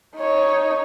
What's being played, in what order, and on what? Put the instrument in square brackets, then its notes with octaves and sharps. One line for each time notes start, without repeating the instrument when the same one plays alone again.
[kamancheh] D#4 C#5